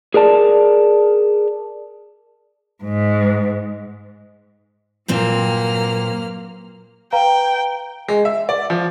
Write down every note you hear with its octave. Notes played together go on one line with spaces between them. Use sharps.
G#4 A#4 D5 A5
G#2
G2 A#2 F#3 A#3 C4 F6
B4 F5 G5 A#5
G#3
E5
D5
F3